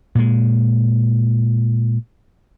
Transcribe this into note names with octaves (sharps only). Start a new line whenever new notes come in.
A#2 G#3